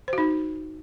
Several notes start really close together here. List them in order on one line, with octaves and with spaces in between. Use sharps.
C5 F#4 D#4